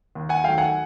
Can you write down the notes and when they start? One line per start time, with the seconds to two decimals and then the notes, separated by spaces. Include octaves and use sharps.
0.15 D#2
0.29 F#5 G#5
0.44 D#3 F#3 A3 F5 G5
0.58 F#5 G#5